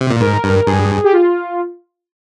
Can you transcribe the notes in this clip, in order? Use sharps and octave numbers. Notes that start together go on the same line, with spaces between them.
C3
A#2
G#2 A#4
G2
G2 G#4
G4
F4